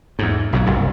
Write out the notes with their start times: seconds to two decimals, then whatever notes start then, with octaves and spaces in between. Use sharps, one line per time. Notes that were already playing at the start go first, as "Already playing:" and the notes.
0.19 E2 G#2
0.53 B1 B2 D#3 F#3
0.66 F#1 C2 G2